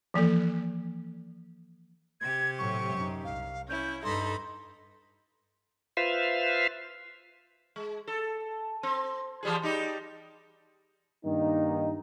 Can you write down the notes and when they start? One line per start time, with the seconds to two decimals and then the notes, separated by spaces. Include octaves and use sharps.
0.14 E3 F3 A#3 A4
2.21 C3 G4 G#6
2.59 A2 F#3 C#6
2.95 F#2 D#4
3.24 C2 F5
3.69 C#4 E4 G6
4.04 G2 D#4 A4 B5 C6
5.97 F4 B4 C5 E5 F5
7.76 G#3
8.08 A4
8.83 C4
9.43 E3 G3 G#4
9.62 G3 D#4 G4
11.25 G2 D#3 A#3 D#4